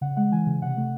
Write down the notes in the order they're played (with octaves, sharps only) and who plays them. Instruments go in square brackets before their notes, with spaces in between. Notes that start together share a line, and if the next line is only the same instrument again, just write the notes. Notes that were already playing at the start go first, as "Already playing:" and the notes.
[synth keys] C#3 F#5
G#3 F#5
E3 G#5
C#3
C3 F#5
A3